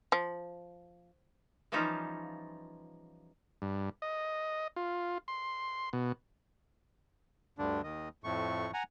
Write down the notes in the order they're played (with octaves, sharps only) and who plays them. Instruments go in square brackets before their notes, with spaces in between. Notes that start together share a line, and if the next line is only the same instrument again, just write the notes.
[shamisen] F3
[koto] E3 F3 G3 C#4 D#4 F4
[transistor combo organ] G2
D#5
F4
C6
B2
[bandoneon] D2 G2 D3 D4
D#2 D#3 D#5
F2 A2 A3 C#6
F#5 G#5 A#5